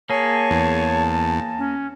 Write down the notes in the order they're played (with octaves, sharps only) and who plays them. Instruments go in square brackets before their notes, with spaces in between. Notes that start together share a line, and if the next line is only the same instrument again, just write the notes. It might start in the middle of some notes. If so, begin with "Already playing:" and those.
[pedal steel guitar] A#3 G#4 [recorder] C#5 [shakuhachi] A5
[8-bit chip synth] E2
[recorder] C#4